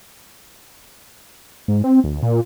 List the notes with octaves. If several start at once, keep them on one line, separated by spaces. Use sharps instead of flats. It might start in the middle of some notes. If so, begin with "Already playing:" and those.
G#2
C4
D2
A#2